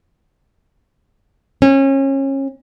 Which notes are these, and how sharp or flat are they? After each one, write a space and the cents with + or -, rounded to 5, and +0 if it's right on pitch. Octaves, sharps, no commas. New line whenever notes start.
C#4 -30